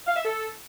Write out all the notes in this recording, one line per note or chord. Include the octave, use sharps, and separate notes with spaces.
F5
E5
A4